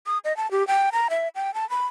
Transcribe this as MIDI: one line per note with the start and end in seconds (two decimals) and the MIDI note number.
0.07 0.18 87
0.25 0.35 75
0.37 0.51 81
0.51 0.66 67
0.67 0.89 79
0.93 1.08 82
1.10 1.28 76
1.35 1.54 79
1.54 1.68 81
1.70 1.87 83